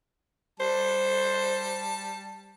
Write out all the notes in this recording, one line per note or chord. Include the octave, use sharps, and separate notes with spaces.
G3 C5 A5